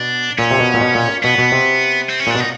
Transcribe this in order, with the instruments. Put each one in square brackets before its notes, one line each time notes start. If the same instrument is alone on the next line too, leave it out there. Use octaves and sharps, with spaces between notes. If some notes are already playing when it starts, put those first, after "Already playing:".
Already playing: [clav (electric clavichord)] B2 [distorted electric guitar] D4
[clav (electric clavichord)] A#2 [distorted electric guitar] C#4
[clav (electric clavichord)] C3
B2
A#2
B2
A#2
[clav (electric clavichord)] B2 [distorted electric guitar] B3
[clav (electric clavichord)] B2
C3
[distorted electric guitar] C4
C#4
[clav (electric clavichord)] A#2
[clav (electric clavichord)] B2 [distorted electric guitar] D4
[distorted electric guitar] D#4